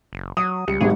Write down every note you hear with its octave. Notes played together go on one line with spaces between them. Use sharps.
F#1
F#3 D#6
C#2 G3 C#7
G#1 G#2 G3 G#4